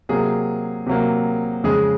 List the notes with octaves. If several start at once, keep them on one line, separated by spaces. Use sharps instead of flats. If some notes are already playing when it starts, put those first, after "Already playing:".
C3 F#3 A#3 G#4
C3 F#3 A#3
F2 C#3 G#3 G#4